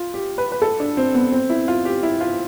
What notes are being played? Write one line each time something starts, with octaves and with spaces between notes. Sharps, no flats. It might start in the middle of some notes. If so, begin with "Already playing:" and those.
Already playing: F4
G4
B4
B4
A4
D4
C4
B3
C4
E4
F4
G4
E4
F4